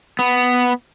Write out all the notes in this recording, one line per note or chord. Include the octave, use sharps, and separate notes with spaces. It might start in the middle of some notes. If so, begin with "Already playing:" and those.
B3